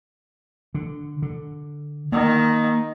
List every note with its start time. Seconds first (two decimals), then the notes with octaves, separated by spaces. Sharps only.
0.75 D3
1.22 D3
2.12 D#3 A#3